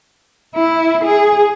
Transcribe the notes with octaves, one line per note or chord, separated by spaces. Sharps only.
E4
G#4